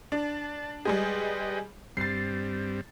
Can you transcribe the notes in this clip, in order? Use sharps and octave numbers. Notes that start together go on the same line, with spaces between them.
D4 A5
G3 G#3 G#4 B4 D#5 G5
G2 G3 C4 A6 C7